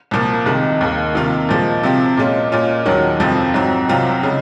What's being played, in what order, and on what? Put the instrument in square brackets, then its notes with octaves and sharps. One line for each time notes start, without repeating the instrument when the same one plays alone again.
[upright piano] C2 A#2 F3 A#3
C2 C3 D#3 G#3
D#2 D#3 A#3
C3 D#3 A#3 F4
A#2 F3 G#3
C3 F3 C4
A#2 G#3 C#4 F4
A#2 G#3 C#4 F4
D#2 D#3 F#3 C#4
F2 C3 F3 C4
G#2 F#3 C4
C2 C3 F#3 C4 F4
C#3 G#3